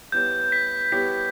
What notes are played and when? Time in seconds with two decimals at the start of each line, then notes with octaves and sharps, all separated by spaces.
0.12 G3 B3 E4 G4 C#5 G6
0.52 B6
0.92 G3 B3 E4 G4 C#5 B6